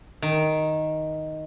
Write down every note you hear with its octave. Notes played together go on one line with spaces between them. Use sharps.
D#3